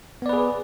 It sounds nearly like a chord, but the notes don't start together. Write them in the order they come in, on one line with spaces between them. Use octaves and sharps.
B3 D5 B4 G#4